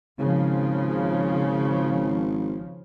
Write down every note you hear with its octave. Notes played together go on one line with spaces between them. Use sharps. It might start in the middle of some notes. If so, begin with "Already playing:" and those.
G#1 C#3 F3